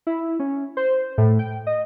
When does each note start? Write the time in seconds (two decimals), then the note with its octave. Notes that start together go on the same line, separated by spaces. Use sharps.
0.07 E4
0.39 C#4
0.77 C5
1.18 A2
1.39 G5
1.67 D#5